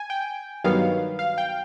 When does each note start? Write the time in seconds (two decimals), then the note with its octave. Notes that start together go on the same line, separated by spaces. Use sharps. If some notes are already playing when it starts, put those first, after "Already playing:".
Already playing: G#5
0.10 G5
0.64 G2 D#3 F#3 B3 F5
1.19 F5
1.38 G5